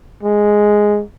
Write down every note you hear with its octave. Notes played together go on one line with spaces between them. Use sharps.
G#3